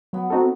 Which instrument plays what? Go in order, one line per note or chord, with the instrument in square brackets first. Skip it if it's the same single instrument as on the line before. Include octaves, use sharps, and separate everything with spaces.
[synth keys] F#3 [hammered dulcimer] B3
[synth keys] C4 D#4 F#4 A4